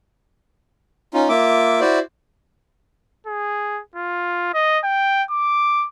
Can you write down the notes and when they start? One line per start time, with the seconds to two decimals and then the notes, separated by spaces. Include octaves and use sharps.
1.14 C#4 D#4 F4
1.29 A#3 F4 E5 D6
1.81 E4 F#4 C5 D5
3.27 G#4
3.96 F4
4.54 D#5
4.84 G5
5.31 D6